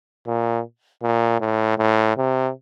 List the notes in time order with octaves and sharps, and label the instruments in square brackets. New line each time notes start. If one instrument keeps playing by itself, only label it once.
[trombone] A#2
A#2
A2
A2
C3